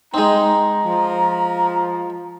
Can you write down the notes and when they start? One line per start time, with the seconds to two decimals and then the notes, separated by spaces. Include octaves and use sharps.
0.14 G#3 C4 D#4 A#5
0.86 F3